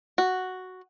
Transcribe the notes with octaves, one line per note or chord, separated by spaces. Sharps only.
F#4